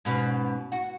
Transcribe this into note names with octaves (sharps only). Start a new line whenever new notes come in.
G#2 B2 C#4
F#4